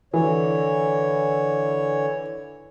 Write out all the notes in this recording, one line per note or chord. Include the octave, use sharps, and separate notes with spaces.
D3 E3 C#5